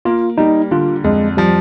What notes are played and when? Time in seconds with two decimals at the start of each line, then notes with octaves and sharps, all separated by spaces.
0.05 A#3 F4
0.38 G3 D#4
0.71 D3 F4
1.04 F2 G#3
1.37 F3 G3